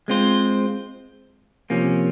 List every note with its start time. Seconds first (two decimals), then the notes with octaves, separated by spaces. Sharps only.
0.08 G#3 C4 F4 C5
1.70 C3 F3 A#3 C#4